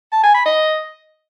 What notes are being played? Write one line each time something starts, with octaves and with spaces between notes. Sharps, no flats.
A5
G#5
B5
D#5